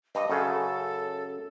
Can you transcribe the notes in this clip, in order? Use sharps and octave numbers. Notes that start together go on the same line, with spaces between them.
G2 D#5
F#2 C#3 A4